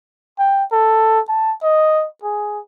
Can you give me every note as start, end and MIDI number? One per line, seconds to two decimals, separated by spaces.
0.39 0.64 79
0.72 1.20 69
1.29 1.54 81
1.63 2.06 75
2.23 2.59 68